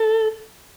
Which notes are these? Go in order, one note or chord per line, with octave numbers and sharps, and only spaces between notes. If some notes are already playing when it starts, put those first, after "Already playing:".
Already playing: A4